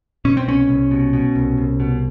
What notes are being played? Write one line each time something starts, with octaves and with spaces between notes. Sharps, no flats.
B2 C#4
C4
C2 C#4
C2
B2
B2
C2
C2
B2